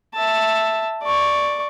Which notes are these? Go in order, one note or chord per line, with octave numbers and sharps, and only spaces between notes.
E5 A5
D5 C#6